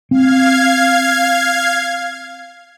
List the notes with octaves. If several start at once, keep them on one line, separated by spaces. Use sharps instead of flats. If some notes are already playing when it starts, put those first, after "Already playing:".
C4 F5 G#6